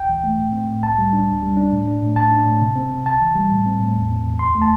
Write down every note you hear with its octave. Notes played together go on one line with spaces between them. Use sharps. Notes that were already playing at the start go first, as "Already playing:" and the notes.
Already playing: D2 G5
E3
A3
A2
C4
A2
C2 A5
G3
D4
D2
G3
D4
A2
D4
A2
A2 A5
D4
A2
C3
C4
C3
C2 A5
E3
G3
A2
C4
A2
E2
C4
E2
D2 C6
A3
A5